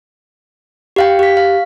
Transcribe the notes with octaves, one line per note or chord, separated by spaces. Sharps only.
G4 F5 G5
G4 B6
F5